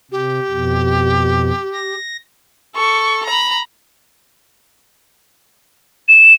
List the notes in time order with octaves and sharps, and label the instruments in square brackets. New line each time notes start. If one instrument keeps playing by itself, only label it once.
[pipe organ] C3 [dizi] G4
[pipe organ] F2 B2
A#6
[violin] A4 C#6
A#5 B5
[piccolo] E7